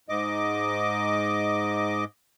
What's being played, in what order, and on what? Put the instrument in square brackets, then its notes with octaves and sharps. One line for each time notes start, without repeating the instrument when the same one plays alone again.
[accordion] G#2 D#5 D6